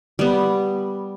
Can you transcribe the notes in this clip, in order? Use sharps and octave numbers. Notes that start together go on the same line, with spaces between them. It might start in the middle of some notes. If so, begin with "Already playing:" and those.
G3 B3